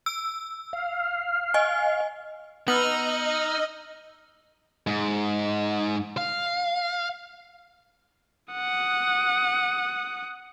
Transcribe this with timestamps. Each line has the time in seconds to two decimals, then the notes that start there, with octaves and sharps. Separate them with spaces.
0.06 E6
0.73 F5
1.54 D#5 G#5
2.68 B3 D#4 D#5 E6 F6 F#7
4.87 G#2
6.17 F5
8.53 F#5 D#6